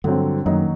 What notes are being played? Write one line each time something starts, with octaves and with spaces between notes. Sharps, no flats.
G2 D3 F#3 C4
F#2 D#3 F#3 A#3 D#4 F#4